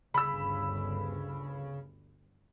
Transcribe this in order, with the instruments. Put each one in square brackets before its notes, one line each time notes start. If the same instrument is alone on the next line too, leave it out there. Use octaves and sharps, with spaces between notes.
[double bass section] G1 D2 G2 [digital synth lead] C#3 [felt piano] B5 E6